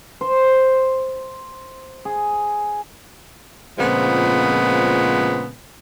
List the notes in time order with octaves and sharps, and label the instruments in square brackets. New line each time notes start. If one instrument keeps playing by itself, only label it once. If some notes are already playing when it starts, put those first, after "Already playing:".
[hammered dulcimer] C5
G#4
[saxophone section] A#2 C#3 F3 G#3 B3 C4